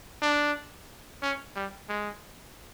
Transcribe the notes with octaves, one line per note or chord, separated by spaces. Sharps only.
D4
C#4
G3
G#3